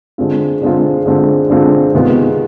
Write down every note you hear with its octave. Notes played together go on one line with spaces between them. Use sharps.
D3 G#3 C4 F4
D3 G#3 C4 F4
D3 G#3 C4 F4
D3 G#3 C4 F4
C3 D#3 G#3 B3 F4